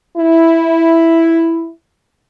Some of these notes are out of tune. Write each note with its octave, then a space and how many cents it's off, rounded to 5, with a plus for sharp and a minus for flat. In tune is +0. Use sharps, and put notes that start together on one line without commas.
E4 +0